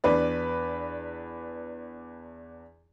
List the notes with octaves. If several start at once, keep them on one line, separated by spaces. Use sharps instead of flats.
E2 D4 B4 D5